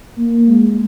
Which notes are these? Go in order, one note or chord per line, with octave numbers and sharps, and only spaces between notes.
A#3
G#3